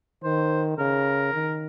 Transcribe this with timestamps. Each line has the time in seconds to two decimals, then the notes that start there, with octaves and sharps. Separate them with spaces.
0.23 D#3 C5
0.78 C#3 A#4
1.33 D#3